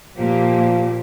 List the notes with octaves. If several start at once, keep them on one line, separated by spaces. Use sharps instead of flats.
A#2 F3 A#3 G4